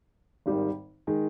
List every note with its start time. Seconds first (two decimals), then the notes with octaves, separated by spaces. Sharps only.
0.46 G#1 G#2 D#3 G3
1.07 D#3 G#3